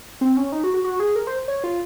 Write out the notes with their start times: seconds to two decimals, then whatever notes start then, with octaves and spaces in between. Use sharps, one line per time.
0.21 C4
0.37 C#4
0.52 D#4
0.64 F#4
0.74 F#4
0.84 F#4
1.00 G#4
1.16 A#4
1.27 C5
1.48 C#5
1.64 F4